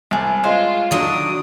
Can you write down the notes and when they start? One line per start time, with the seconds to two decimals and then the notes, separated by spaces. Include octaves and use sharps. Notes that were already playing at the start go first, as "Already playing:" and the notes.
0.11 C2 G#4 A5
0.44 G#3 F4 C5 C#5 F5
0.91 D3 D#3 F#3 D4 D#6